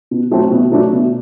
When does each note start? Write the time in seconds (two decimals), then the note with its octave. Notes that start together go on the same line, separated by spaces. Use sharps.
0.11 B2
0.31 F#3 A3 C4
0.51 B2
0.72 F#3 A3 D4
0.93 B2